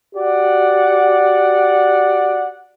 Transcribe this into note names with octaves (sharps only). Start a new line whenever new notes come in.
F#4 G4 D5 F#5